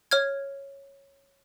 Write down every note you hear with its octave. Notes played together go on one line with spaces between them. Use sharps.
C#5 F6 G#6